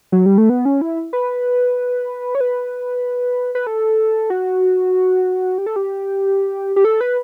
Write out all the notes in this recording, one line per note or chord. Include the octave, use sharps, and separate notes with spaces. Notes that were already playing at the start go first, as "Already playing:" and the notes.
F#3
G3
A3
B3
C#4
E4
B4
C#5
B4
B4
A4
F#4
G4
A4
G4
G4
A4
B4